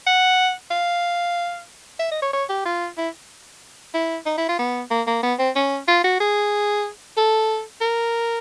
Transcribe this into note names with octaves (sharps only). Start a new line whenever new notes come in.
F#5
F5
E5
D#5
C#5
C#5
G4
F4
E4
E4
D#4
E4
F4
B3
A#3
A#3
B3
C4
C#4
F4
F#4
G#4
A4
A#4